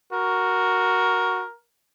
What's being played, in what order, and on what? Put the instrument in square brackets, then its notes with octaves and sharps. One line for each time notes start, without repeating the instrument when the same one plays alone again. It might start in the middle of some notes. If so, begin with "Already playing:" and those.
[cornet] F#4 [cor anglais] A#4